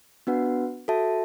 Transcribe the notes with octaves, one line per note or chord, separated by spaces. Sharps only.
B3 D4 F#4 B4 F#5
F#4 A4 E5 A5